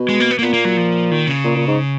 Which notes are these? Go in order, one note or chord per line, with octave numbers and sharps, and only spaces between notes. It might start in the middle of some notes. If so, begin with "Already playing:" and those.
Already playing: B2
G#3
A#3
B3
A#3
A#2 B3
A#3
F#3
F3
D#3
C#3
A#2
A#2
G#2